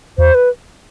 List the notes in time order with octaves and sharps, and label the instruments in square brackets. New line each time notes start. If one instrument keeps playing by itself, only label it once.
[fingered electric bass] E2 [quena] C5
[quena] B4